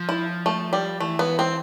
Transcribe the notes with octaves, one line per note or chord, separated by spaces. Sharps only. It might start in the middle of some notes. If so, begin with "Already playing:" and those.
Already playing: F3
E4
A3
G3
E3 A3
B3
C4